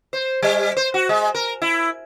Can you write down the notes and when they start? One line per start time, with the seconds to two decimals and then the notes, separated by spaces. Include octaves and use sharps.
0.13 C5
0.42 G3
0.77 C5
0.94 F#4
1.09 G#3
1.35 A#4
1.62 E4